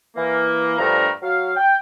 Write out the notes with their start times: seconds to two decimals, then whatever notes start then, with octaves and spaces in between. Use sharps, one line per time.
0.17 E3 A#3
0.79 G2 D3 F3 A3 A#4 A#5
1.22 F#3 F5
1.56 G5